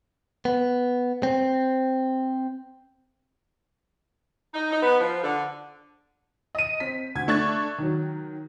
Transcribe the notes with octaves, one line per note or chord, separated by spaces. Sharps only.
B3
C4
D#4
D#4
B3
F3
D3
D#5 D#7
C4 B6
D2 G#6
A3 D4 C#6 F#6 A6
D#3 F#3